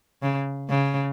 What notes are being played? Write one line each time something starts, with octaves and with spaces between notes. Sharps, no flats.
C#3
C#3